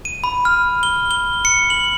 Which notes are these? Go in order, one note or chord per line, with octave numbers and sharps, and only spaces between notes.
D#7
B5
F6
G7
G7
C#7
F#7